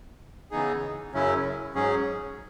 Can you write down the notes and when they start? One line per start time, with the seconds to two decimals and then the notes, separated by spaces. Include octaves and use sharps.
0.51 C#3 E3 B3 D#4 G#4
1.13 F#2 C#3 F#3 C#4 E4
1.74 G#2 F#3 C#4 G#4